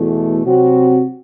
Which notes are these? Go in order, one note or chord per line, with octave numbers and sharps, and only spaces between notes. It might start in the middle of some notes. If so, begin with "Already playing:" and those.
Already playing: E2 B2 A3
C3 F#3 C4 F#4